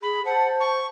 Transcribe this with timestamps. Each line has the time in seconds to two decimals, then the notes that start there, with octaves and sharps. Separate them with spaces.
0.03 G#4 B5
0.25 C5 F#5 A5
0.60 C#6